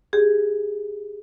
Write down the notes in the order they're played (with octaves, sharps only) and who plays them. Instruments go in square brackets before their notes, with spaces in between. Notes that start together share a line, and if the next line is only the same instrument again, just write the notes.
[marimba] G4 G#4